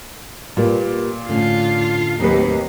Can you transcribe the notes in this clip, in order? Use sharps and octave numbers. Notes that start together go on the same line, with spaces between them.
A#2 G3 A#3 F4 A#4 B4
A2 D3 C#4 F4
D#2 F#3 C4 D#4 G4 B4